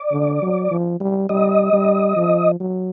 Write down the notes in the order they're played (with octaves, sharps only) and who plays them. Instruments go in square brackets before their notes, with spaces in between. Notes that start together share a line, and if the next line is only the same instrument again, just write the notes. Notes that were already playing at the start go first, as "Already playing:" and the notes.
Already playing: [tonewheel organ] D5
[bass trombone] D3
F#3
F3
G3
[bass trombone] G3 [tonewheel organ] D#5
[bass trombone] G3
F3
F#3